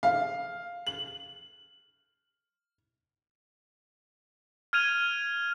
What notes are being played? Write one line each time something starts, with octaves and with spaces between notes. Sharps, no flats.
F5
F#7
F6 G#6 D#7 F7